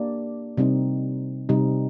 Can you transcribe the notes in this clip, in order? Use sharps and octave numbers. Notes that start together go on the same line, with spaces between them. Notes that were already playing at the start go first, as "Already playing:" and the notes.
Already playing: A#3 D4 G4 D5
C3 G3 C4 D#4
C3 G3 C4 D#4